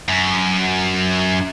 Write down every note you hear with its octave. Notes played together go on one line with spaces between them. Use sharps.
F#2